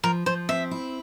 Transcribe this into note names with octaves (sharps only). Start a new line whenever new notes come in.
F3 A#4
F3 C5
C4 E5
E4